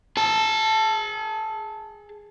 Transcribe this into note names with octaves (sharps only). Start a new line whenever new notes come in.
G#4 A5